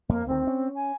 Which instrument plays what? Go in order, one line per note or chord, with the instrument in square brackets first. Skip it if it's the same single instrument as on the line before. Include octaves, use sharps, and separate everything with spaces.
[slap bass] F2 [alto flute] A#3
[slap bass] D2 D#3 [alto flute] C4
[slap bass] C#4
[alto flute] G#5